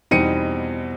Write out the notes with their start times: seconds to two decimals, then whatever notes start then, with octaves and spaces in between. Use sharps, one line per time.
0.11 E2 B2 G3 C4 D#4 C#7 D#7